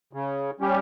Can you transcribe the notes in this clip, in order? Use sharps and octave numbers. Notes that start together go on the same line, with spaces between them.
C#3
G3 C#4 G4